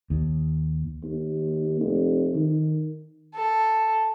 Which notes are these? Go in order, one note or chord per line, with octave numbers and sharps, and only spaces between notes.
D#2
D#2
F1
D#3
A4